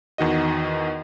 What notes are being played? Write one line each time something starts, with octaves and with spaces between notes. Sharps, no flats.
E2 D#3 F#4 D#5